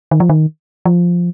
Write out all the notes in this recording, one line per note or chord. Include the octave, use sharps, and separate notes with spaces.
D#3
F3
D#3
F3